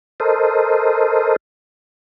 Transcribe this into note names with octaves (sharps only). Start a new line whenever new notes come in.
A4 A#4 C5 D#5